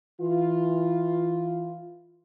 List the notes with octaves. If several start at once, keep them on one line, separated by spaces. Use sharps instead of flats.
E3 F4